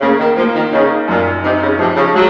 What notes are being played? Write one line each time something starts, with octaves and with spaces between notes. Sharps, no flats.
C#3 A#3
D#3
F3 A#3
D#3
C#3 D#4
F#2 A#2
C3 D#4
C#3
C3 F3
C#3
F#3 G#3